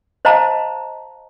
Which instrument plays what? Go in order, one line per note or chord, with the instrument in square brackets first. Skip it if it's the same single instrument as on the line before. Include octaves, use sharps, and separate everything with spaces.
[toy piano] C5 D#5 F5 A5 A#5